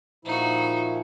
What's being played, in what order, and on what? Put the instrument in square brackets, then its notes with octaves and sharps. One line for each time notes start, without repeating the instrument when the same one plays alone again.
[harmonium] A#2 F3 E4 [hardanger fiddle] D#4 F#4